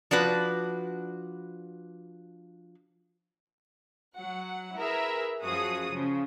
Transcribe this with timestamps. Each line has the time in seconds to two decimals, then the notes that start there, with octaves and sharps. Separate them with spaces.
0.11 F3 D4 F#4 B4
4.16 F#3 F#5
4.77 E4 G#4 A#4 B4 E5
5.45 F#2 F3 F#4 G#4 D#6
5.93 C#3 F3